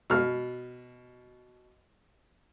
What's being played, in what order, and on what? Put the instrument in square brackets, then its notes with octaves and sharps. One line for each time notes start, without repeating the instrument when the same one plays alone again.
[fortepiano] B2 F6